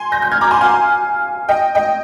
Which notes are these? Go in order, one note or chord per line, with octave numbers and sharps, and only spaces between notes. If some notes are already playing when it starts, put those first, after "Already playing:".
Already playing: G#5 C6
G6 A#6
G6
F6 G#6
A#5 D6
G#5 C6
F5 G#5
D#5 G5
D#5 G5